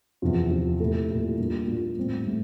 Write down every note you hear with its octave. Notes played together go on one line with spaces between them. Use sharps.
E2 C3 F3 C4 F4
E2 C3 F3 C4 F4
A#2 A3 E4 G4
A#2 A3 E4 G4
A#2 G3 A#3 D4 F4
A#2 G3 A#3 D4 F4
A2 G3 C4
A2 G3 C4